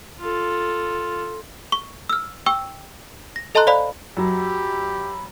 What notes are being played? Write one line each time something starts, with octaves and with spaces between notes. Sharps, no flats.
F4 A4
C#6
E6 F6
G5 C#6 E6
A#6
A4 D#5 A5 A#5 C6 F#6
C5 D5 F5 B5
F#2 F#3 G4 B5